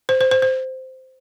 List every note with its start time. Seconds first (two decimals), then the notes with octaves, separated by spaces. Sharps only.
0.09 C5
0.21 C5
0.31 C5
0.42 C5